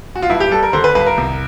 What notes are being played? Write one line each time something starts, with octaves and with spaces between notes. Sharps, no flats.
F#4
F4
G2 E4
G4
G3 A4
A#4
D3 C5
B4
G2 B4
A#4
C2